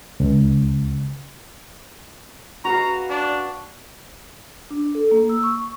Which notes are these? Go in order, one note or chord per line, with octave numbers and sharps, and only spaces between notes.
C#2
F#4 B4 F5 A#5
D4
D4
A4
A#3
E6
C#6